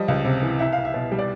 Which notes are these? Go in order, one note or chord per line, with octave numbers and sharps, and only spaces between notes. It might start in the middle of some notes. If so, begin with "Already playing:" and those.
Already playing: F3 G3 D#5
C#2
C3
E3
C2 E5
C2 F5
E5
B2
G3
D5